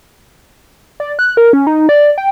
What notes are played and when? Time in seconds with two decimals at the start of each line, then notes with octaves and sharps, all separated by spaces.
1.00 D5
1.19 F#6
1.37 A#4
1.53 C#4
1.67 D#4
1.89 D5
2.18 G5